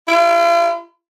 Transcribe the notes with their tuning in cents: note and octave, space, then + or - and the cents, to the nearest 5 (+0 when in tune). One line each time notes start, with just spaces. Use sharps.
F4 -45